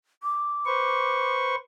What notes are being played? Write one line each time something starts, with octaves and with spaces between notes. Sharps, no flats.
D6
B4 C5 C#6